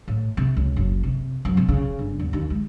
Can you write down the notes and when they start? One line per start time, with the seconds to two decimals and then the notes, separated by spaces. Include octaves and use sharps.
0.08 A2
0.37 C3
0.57 C#2
0.76 F#1
1.03 C3
1.45 F#2
1.57 C3
1.69 C#3
1.99 G1
2.20 E2
2.33 D#2
2.50 G#3